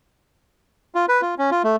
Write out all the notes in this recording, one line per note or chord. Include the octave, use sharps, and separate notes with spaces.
F4
B4
F4
C#4
F4
A3